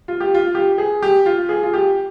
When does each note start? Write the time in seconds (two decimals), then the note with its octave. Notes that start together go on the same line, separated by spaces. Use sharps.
0.08 F4
0.20 G4
0.35 F4
0.55 G4
0.78 G#4
1.02 G4
1.26 F4
1.49 G#4
1.63 F4
1.74 G4